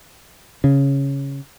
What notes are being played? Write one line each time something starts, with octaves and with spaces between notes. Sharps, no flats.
C#3